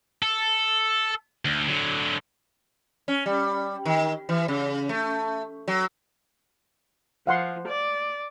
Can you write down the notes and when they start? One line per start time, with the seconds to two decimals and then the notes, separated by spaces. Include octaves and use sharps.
0.22 A4
1.45 D2
1.68 D3 F#3
3.08 C#4
3.26 G3
3.85 D#3
4.29 E3
4.48 C#3
4.89 A3
5.68 F#3
7.27 F3 F5 F#5 C6
7.68 D5